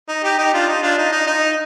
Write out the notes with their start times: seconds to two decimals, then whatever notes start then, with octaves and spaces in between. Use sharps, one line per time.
0.09 D#4
0.24 D#4 G4
0.38 D#4 G4
0.53 D4 F4
0.68 D#4
0.83 D4 F4
0.98 D#4
1.12 D#4
1.27 D#4